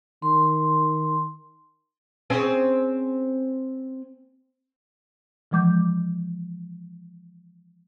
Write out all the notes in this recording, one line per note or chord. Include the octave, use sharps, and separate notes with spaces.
D#3 C6
C4 C#4 G#4
E3 F3 G#3 D6 G6